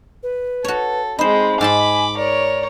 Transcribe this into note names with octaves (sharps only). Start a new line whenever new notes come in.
B4
F#4 A4 C#5
G#3 C4 D#4 C5 B5
G#2 G#5 A5 B5 C6 D6
A#4 C#5 D5